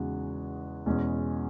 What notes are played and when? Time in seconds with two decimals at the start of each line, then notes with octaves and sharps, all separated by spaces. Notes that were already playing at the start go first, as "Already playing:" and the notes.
Already playing: E2 C#3 G#3 D#4 F#4
0.86 E2 B2 G#3 C#4